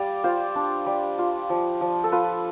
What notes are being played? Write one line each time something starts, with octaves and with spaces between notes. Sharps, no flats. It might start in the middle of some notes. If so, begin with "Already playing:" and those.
Already playing: G3 D5 F5
F4 C5
D4
G3
F4
F3
F3
A4
F4 B4